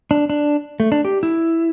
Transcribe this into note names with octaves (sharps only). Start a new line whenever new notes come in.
D4
D4
A3
D4
G4
E4